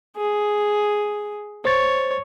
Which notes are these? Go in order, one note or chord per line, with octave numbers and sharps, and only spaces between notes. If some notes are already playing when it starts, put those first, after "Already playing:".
G#4
C5 C#5 A6